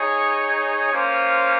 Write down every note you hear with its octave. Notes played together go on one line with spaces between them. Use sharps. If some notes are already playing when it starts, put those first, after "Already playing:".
Already playing: D#4 G#4 C#5
A#3 C#4 F4 C5